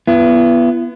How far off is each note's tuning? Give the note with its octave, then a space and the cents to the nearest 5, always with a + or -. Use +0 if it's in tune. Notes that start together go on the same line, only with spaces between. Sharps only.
B3 -5 E4 +40